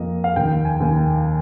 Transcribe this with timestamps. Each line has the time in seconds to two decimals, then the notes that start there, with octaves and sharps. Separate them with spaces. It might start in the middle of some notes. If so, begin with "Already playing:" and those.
Already playing: F2 A#3 D#5
0.24 F5
0.36 D#2 G5
0.65 G#5
0.80 D#2